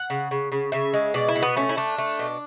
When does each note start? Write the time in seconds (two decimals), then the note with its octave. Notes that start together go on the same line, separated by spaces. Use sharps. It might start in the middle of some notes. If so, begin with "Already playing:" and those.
Already playing: F#5
0.10 C#3
0.31 C#3
0.52 C#3
0.72 C#3 E5
0.94 G#3
1.14 B2 D5
1.28 E4
1.35 B2
1.43 B3
1.57 A3 C#4
1.69 E4
1.77 A3 D4
1.98 A3
2.19 B2